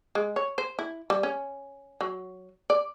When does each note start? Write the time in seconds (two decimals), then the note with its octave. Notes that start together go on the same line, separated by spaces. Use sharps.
0.15 G#3
0.36 C#5
0.58 C5
0.79 E4
1.10 G3
1.23 C#4
2.01 F#3
2.70 D5